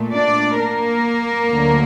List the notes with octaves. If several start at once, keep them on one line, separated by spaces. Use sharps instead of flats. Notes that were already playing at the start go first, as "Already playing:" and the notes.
Already playing: A#2 A3
D4 D5
A#3 A#4
D2 D3 F#3